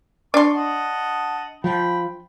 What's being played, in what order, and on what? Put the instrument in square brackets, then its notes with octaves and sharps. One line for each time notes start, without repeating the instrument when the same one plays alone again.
[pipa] D4 C6 [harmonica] C#6
[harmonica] D#5 F#5 A5
[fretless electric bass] F3 [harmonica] G5 B5